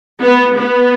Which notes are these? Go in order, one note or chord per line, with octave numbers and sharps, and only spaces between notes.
B3
B3